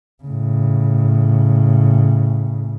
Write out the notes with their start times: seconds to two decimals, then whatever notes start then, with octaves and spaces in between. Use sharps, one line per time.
0.23 A2 C#3